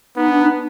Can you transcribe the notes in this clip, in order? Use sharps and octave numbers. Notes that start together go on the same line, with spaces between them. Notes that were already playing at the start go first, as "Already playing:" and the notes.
B3 D#4
D4
D#4